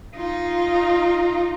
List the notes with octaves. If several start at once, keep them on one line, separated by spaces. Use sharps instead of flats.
D#4 F4